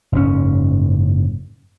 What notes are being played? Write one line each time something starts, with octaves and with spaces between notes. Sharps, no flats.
F#1 G#2 C#4